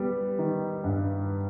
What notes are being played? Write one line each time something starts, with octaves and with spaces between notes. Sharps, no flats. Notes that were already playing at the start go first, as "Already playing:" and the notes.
Already playing: G3 B3
D#3
G2